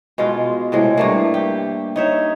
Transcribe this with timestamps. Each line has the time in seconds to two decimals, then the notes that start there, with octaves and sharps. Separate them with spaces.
0.18 B2 G#3 F4
0.72 A2 C3 G#3
0.97 G2 A3 A#3
1.34 G4
1.96 D#4 C#5 E5